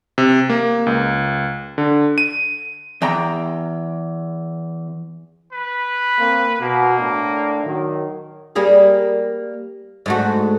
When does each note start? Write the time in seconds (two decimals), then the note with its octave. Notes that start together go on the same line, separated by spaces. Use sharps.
0.18 C3
0.50 A#3
0.87 C#2
1.78 D3
2.18 D#7
3.02 E2 G5 A#5
5.52 B4
6.19 A#3 C4
6.61 B2 A#3
7.00 A2 D4
7.65 D#3 F#3
8.56 G3 A#3 G#4
10.06 G#2 A3 F#4